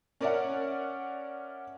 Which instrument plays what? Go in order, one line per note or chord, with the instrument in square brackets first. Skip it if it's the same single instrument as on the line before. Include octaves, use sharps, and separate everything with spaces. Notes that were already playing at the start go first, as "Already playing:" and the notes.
[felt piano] C#4 A#4 D5 E5 F#5